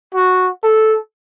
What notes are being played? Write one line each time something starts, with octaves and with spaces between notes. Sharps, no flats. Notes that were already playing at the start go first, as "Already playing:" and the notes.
F#4
A4